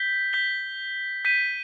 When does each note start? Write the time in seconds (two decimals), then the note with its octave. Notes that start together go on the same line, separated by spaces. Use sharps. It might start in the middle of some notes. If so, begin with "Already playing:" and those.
Already playing: G6 B6 G7
0.33 G6 B6 G7
1.25 G6 B6 D#7